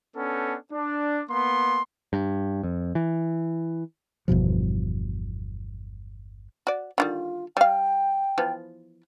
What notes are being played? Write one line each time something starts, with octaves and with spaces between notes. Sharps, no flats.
B3 C#4 D4 A4
D4
A#3 B3 C6
G2
F2
E3
G1 E2 B2 F3
F#4 D5
D3 D#3 G3 F4
G3 F5 G5
E3 F3 B3